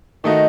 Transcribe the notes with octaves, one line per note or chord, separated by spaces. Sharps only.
D#3 A3 D#4 F#4 D#5